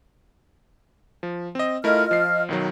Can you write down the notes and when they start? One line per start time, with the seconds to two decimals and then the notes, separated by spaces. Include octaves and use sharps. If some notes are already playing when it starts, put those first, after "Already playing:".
1.23 F3
1.55 C4 D#5
1.84 A3 E4 F4 A#4 D#5 F6
2.11 F3 C7
2.49 B1 D#3 F#3